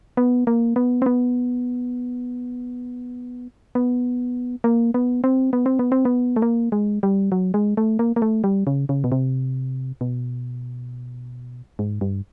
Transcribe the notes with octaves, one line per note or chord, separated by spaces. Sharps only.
B3
A#3
B3
C4
B3
B3
A#3
B3
C4
B3
C4
B3
C4
B3
A3
A#3
G#3
G3
F#3
G#3
A3
A#3
A#3
A3
G3
C#3
C#3
B2
C3
B2
G#2
G2